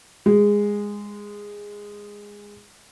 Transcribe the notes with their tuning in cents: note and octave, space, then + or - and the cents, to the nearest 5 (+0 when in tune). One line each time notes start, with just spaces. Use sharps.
G#3 -15